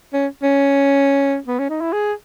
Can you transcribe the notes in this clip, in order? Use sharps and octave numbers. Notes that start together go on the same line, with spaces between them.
C#4
C#4
B3
C#4
D#4
E4
G#4